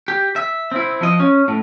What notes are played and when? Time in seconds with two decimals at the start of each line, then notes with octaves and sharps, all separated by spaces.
0.08 G4
0.36 E5
0.72 C4 E4
1.01 F3 D#5
1.20 C#4
1.48 A2